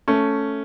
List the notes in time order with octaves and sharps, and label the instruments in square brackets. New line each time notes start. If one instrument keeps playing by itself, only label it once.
[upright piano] A3 C#4